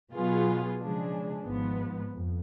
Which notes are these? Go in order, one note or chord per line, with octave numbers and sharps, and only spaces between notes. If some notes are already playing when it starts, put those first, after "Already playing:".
B2 F#3 B3 F4 G#4
C#3 F3 G#3 D4 G#4
G#1 G#2 F3 B3
F2